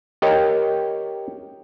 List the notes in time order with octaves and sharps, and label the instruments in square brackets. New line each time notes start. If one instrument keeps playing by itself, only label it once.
[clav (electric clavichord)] G4 A#4 C#5 D#5 G5